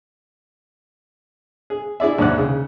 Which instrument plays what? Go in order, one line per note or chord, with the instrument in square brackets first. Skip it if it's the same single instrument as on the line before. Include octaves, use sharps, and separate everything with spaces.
[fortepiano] G#4
E4 G#4 D5 E5
D#2 G#2 D5 F#5 F#6
C#3